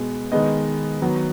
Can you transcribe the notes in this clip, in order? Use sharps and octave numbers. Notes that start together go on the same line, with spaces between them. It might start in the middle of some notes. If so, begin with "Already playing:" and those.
Already playing: B2 G#3 B3
D#3 G#3 B3 D#5
D#3 F#3 B3